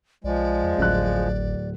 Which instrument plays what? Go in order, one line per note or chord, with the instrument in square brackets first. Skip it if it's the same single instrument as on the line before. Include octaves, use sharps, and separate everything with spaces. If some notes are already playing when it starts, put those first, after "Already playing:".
[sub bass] B1 [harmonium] F3 G#3 [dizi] D5
[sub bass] E2
[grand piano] D1 F#6 [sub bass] G#1